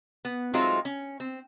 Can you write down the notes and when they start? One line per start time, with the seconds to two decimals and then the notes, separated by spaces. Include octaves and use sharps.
0.25 B3
0.54 F#3 G#3 A3 C4 D#4 F4
0.85 C#4
1.20 C4